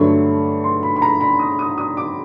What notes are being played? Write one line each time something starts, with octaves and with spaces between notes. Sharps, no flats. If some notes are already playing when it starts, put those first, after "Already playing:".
Already playing: G2 D3 F#3 A3 C#6
C6
B5
B5
A#5
B5
D#6
D#6
D#6
D6